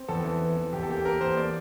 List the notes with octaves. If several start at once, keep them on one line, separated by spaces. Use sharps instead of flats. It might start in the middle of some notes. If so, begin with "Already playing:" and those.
Already playing: C4
E2 A4
E3
E3
E3
E2 G4
A4
A#3 G4
A#3 A#4
E2 C5
A#3 D5